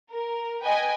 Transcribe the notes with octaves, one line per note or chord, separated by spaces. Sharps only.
A#4
B4 D#5 G5 G#5